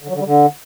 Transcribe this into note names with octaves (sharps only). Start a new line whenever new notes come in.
D3
F#3
D3
G3
D3